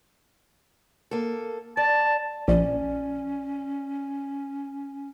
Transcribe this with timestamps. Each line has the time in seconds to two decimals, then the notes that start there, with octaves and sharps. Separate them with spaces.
1.11 A#3 A4
1.77 D5 A5
2.48 A#1 C#4 D5